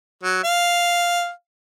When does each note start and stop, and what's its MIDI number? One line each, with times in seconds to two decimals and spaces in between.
0.23 0.42 54
0.44 1.30 77